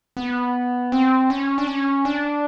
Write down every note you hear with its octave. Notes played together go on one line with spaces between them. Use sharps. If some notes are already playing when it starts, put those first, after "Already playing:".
B3
C4
C#4
D4
C#4
D4